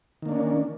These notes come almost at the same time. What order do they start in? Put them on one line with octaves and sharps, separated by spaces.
D#3 A#3 D4 C#4